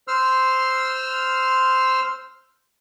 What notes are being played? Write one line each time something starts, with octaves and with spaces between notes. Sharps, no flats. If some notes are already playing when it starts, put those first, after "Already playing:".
C5 C6 E6 F6